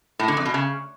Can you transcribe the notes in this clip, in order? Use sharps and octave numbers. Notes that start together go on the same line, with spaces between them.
A2
D3
F2
B2
C#3